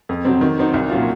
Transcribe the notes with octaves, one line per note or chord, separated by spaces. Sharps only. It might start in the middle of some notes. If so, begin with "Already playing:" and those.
F2
C3 F#3 C4
D#3
F#3 C4 D#4
C2
A#2 F#3 C#4 F4